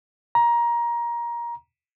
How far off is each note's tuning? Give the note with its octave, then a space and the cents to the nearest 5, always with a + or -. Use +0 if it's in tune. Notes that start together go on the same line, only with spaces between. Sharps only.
A#5 +20